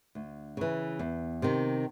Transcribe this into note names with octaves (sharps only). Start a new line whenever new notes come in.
D2
C#3 E3
E2
C3 D#3